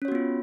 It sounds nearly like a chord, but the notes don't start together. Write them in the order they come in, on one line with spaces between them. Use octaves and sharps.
C#4 C#5 F#4 B3 F4